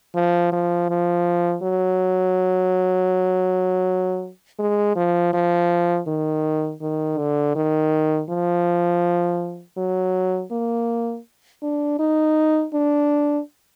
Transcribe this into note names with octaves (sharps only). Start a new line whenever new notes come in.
F3
F3
F3
F#3
G#3
F3
F3
D#3
D#3
D3
D#3
F3
F#3
A#3
D4
D#4
D4